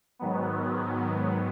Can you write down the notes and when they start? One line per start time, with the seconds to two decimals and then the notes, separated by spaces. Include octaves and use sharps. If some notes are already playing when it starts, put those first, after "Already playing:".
0.19 G#2 D#3 F#3 B3